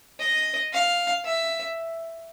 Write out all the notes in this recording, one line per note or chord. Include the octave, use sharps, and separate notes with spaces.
D#5
F5
E5